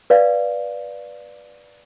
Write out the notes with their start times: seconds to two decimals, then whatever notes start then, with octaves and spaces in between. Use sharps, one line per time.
0.10 B4 D5 F5